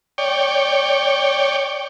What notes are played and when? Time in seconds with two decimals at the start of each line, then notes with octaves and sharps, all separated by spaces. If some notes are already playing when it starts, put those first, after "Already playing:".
0.18 C#5 D5 G5